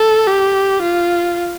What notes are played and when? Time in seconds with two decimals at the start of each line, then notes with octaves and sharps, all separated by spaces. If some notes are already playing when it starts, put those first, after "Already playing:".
Already playing: A4
0.27 G4
0.82 F4